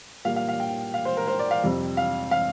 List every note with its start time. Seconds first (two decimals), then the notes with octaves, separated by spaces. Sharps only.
0.25 A#2 G3 A#3 F5
0.36 F5
0.48 F5
0.60 G5
0.94 F5
1.05 C5
1.17 A#4
1.28 C5
1.39 D5
1.51 F5
1.63 F2 C3 G3 C4
1.97 F5
2.31 F5